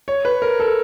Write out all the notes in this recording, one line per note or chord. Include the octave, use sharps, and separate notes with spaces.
C#5
B4
A#4
A4